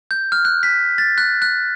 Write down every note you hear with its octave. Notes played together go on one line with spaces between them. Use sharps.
G6
F6
F#6
B6
A6
F#6
F#6